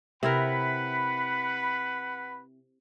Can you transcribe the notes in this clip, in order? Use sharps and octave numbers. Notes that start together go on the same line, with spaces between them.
C3 E4 A#4 B4 F#5 B5